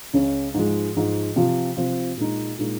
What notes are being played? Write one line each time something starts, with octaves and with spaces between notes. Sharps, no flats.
C#2 C#3 G#3 C#4
G#2 F3 G#3
G#2 F3 G#3
C3 F3 C4 F4
C3 F3 C4 F4
A#2 G#3 D#4
A#2 G#3 D#4